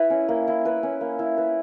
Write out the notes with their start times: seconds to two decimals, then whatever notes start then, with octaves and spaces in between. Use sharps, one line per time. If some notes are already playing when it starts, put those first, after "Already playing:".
Already playing: E4 B4
0.10 C#4
0.29 A#3
0.48 E4
0.65 B4
0.83 C#4
1.01 A#3
1.19 E4
1.38 B4